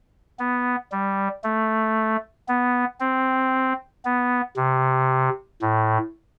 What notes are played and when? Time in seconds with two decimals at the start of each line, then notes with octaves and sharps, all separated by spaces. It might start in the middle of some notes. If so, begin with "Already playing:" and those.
0.39 B3
0.92 G3
1.44 A3
2.48 B3
3.00 C4
4.05 B3
4.57 C3
5.62 A2